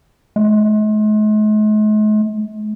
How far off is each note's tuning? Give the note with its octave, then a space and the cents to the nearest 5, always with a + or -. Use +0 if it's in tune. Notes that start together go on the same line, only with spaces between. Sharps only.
G#3 +45